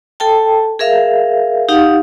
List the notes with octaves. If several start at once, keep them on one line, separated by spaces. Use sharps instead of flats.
A4 G5 A5
G#4 A#4 E5 F5
D#4 G4 F5 F#5